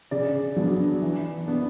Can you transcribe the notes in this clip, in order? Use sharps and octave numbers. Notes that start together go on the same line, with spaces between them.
C#3 D5
F#3 B3 D4
E3
B3 D4